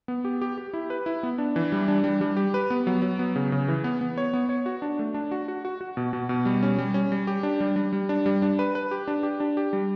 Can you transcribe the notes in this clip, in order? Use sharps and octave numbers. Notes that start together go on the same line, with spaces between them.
B3
G4
G4
G4
E4
B4
E4
B3
D4
E3
G3
D4
G3
G3
G4
B4
B3
F#3
F#3
B3
C#3
C#3
E3
B3
B3
C#5
B3
C#5
F#4
D4
A3
D4
F#4
F#4
F#4
F#4
B2
B2
B2
G3
C#4
G3
C#4
G3
G4
D4
G3
G3
G3
D4
G3
D4
B4
B4
G4
D4
G4
D4
G4
G3